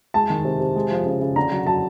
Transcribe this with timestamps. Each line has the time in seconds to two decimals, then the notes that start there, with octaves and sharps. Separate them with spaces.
0.14 G#3 A5
0.30 D#3
0.45 C3
0.60 C3
0.76 G#3
0.91 F3
1.06 C#3
1.21 C#3
1.36 D3 A#5
1.52 F#3
1.67 F#3 A5